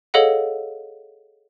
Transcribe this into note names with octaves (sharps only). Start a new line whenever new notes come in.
G#4 A4 C#5 D#5 F5 F#5